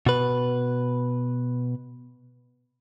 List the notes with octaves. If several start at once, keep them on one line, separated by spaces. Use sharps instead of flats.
B2 B4